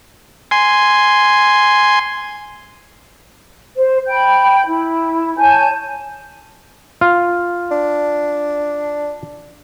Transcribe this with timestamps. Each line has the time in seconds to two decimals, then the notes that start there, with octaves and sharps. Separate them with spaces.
0.51 G#5 C6
3.76 C5
4.06 G5 B5 G6
4.66 E4
5.38 C#5 G#5 A5 G6
7.01 F4
7.71 D4